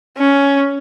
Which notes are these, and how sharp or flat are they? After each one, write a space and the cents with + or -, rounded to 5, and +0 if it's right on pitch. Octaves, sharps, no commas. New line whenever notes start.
C#4 +10